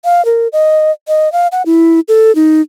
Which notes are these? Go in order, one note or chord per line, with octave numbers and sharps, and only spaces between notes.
F5
A#4
D#5
D#5
F5
F#5
E4
A4
D#4